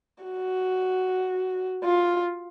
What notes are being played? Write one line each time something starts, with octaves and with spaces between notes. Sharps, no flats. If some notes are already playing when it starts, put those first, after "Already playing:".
F#4
F4